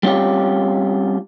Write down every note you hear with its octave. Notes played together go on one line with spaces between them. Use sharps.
G3 C4 C#4 F4 G4